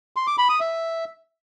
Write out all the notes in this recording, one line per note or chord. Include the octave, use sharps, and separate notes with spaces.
C6
D6
B5
D#6
E5